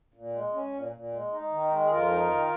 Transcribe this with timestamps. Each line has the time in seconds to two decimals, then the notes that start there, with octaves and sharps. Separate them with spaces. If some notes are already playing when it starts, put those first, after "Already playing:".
0.14 A#2
0.34 G#3
0.53 C#4
0.73 A#2
0.93 A#2
1.12 G#3
1.32 D#4
1.51 D#3
1.71 G#3
1.84 G#4
1.90 F2 F4 A#4
2.10 D#4
2.30 D#3